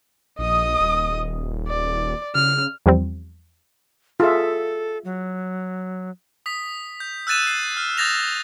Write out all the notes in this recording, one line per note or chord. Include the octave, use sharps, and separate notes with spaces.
A#1 D#5 D#6
D#1
D5
C#3 F6
E2 F3 G3 C4
F4 G#4 A4 E5
F#3
D#6 B6
G6
E6 F#6 G6 A6 D#7 E7
C7
F6
D#6 G6 A6 A#6 F7